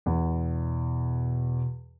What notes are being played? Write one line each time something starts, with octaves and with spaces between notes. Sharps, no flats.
E2 B2